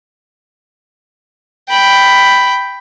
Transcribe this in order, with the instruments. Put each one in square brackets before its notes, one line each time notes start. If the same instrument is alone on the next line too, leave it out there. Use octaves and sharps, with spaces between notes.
[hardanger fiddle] G5 B5